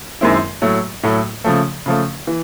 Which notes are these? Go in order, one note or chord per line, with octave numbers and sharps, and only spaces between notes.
F#2 D#3 G#3 C4 E4
A2 F#3 A3
A2 F#3 A3
C#3 F3 A3
C#3 F3 A3
E3